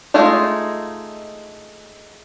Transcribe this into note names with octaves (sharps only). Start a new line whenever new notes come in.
G#3 A3 D#4 F4 G#4